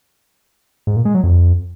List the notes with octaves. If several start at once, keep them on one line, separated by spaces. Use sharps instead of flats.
G#2
A#2
G#3
F#3
F2